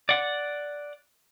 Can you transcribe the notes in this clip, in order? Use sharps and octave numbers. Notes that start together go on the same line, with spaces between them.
D5 F#5